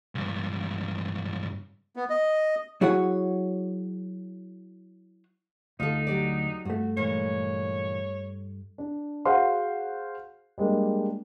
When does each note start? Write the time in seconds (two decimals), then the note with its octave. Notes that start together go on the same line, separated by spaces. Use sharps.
0.15 C#2 G2
1.96 B3
2.10 D#5
2.81 F#3 E4 F#4 G#4 C#5 F#5
5.80 D2 D#4 F4 A4
6.07 F#3 G4 D5
6.65 G2 A3 F#4
6.97 A#2 E3 G#3 C#5
8.78 D4
9.25 F#4 G#4 C5 F5 F#5 C6
10.58 G3 G#3 A#3 D4